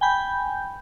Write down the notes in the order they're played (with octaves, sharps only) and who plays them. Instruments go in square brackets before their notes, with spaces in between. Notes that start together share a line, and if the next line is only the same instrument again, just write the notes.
[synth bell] G5 G#5 B5 G6